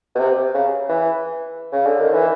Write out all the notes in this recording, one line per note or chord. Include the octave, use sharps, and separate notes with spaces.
B2
C3
C#3
E3
C#3
D3
D#3
E3